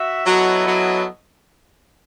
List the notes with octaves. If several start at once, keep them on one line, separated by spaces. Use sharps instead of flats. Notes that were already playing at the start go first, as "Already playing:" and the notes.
Already playing: F#4 E5
F#3 B3 E4 A4 D#5
F#3